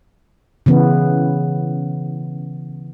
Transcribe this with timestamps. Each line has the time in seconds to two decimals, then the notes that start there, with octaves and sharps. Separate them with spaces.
0.66 C#3 E3 B3